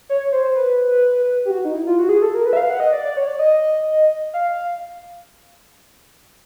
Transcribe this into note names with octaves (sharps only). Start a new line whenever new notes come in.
C#5
C#5
C5
C5
B4
G4
F#4
D#4
E4
F4
F#4
G#4
A4
A#4
B4
E5
F5
F#5
D#5
D5
D5
C#5
D5
D#5
F5